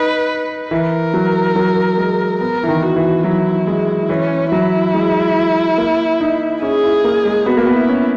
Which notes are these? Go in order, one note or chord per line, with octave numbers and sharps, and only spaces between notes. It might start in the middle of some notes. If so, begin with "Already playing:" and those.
Already playing: D#4 B4
E3 A#4
F#3
F#3
G#3
B3 A#4
E3
D#3
F#4
E3
F#3 E4
G#3
E3 C#4
F#3 E4
G#3
A#3
D#4
C#4 G#4
E4
A#3
G#3
B3 F#4
A#3
B3
E4
C#4